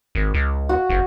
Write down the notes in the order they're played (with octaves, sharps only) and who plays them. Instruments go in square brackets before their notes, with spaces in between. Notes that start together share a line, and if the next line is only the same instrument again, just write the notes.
[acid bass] G#1
C#2
[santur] F#4
[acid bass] F#1